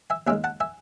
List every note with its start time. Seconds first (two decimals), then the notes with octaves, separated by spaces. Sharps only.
0.10 E5 G#5
0.27 D#2 C#3 G#3 E5 G#5
0.44 F#5 A5
0.60 E5 G#5